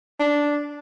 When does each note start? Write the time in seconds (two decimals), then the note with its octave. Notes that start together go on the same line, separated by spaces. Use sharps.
0.20 D4